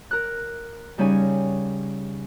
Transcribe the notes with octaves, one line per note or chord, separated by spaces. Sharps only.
A#4 F#6
C#3 G3 C#4 D#4 G#5